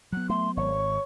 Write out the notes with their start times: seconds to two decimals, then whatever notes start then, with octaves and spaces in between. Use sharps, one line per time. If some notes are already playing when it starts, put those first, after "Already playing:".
0.13 F#3 B3 F#6
0.29 A3 C6
0.57 G#1 C#5 C#6